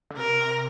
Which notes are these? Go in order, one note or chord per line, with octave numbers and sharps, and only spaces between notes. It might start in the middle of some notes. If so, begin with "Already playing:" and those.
D3
C3 A#4